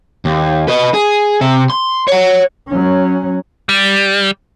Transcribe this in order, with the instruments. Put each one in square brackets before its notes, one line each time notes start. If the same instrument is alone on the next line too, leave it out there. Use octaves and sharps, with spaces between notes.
[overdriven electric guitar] D#2
B4 D#5
G#4
C3 E5
C6
C#5 F#5
[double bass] F#3 C#4
[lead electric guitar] G3